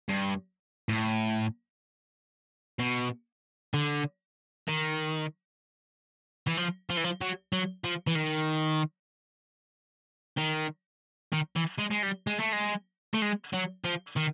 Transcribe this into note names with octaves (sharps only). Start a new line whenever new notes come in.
G2
A2
B2
D3
D#3
E3
F3
F3
E3
F3
F#3
F#3
F3
E3
D#3
D#3
D#3
E3
G#3
G#3
G3
G#3
A3
G#3
A3
G#3
F#3
F3
D#3